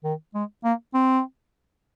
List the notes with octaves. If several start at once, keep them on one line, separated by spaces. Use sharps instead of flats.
D#3
G#3
A#3
C4